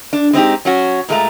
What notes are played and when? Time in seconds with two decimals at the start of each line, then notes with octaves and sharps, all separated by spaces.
0.13 D4
0.33 G#3 C4 D#4 G4
0.65 F#3 C#4 F#4
1.09 A#2 G#3 A3 A#5